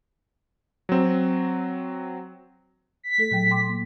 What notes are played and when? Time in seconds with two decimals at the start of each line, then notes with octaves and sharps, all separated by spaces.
0.89 F#3 C4
3.03 B6
3.18 A3 A4
3.31 A#2 F#3 G5
3.51 G5 C6 D6
3.70 A#3